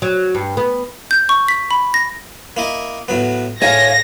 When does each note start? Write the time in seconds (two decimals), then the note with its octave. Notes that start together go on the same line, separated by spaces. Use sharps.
0.02 F#3
0.35 G2
0.57 B3
1.11 G6
1.29 C#6
1.48 B6
1.71 B5
1.94 A#6
2.57 A#3 E4 D#5
3.08 A2 F#3 B3
3.62 A2 C#5 F5 G#5 A#6